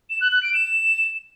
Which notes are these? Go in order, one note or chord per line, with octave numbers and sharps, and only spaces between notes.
E7
F#6
F#6
D7
E7